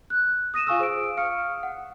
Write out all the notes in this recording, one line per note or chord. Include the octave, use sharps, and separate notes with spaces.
F#6
D#6 A#6 D#7 E7
F4 F5 G#5 C#6 D#6 E6
G#4 C5 E6 D7
F5 C#6 D#6 F6 C#7
F#5